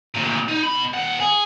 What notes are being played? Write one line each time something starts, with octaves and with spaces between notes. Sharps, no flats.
D2 A#2
D#4
B2 B5
D#2 F#5
G#4